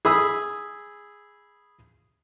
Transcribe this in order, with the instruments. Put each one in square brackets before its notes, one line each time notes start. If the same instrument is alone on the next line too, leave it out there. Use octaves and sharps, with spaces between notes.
[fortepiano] G#4 B5 D#6 E6